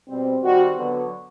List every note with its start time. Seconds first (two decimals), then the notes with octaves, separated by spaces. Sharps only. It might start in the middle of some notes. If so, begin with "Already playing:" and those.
0.09 B2 G3 C4
0.43 D#3 G3 C4 F#4
0.76 D3 F#3 B3